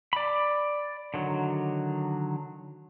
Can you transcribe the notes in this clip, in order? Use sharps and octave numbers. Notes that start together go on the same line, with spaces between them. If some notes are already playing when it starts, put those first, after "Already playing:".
D5 B5
D3 D#3 F#3